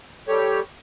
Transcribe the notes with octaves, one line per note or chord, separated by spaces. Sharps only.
G3 G4 A4 C#5